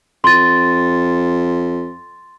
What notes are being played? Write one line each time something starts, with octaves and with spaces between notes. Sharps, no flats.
F2 C6 A6